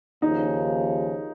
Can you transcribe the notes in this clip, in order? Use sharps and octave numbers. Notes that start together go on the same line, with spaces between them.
D#2 C#3 F3 D#4